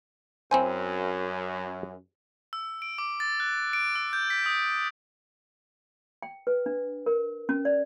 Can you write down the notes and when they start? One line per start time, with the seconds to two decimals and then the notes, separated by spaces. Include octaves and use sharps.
0.51 F#2 C4 E4 C5 G#5
2.53 E6
2.82 D7
2.98 D6
3.20 A6
3.40 F#6
3.73 D7
3.95 E6
4.13 G6
4.30 B6
4.46 D#6
6.22 G5
6.47 B4
6.66 D4
7.06 A#4
7.49 C#4
7.65 D5